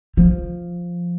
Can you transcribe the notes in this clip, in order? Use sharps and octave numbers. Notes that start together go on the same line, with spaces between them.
F3